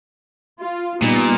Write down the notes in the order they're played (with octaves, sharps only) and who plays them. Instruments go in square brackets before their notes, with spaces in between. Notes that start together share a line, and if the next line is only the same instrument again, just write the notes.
[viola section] F4
[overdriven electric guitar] A#2 [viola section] G3 B3 D#4